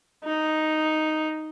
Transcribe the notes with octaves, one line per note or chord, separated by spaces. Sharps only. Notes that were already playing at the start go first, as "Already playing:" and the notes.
D#4